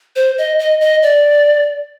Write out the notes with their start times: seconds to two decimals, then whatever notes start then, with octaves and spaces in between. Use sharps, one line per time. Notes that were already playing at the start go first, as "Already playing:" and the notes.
0.16 C5
0.38 D#5
0.59 D#5
0.81 D#5
1.02 D5